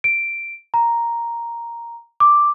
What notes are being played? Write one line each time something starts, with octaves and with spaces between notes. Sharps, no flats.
D7
A#5
D6